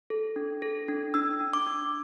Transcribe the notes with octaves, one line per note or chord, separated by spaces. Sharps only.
A4
D4
A4
D4
D4 E6
D4
D6
D4